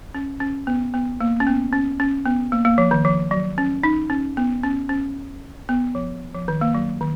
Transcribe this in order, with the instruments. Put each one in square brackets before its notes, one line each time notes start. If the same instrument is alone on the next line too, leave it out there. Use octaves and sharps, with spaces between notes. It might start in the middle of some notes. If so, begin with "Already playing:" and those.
[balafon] C#4
C#4
B3
B3
A#3
C#4
B3
C#4
C#4
B3
A#3
A#3
F3
D#3
F3
F#3
C#4
D#4
C#4
B3
C#4
C#4
B3
F3
F3
D#3
A#3
F#3
D#3